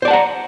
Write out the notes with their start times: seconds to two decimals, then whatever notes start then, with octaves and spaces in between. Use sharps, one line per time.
0.02 C5
0.05 D5
0.08 A5
0.11 F#5
0.13 A#5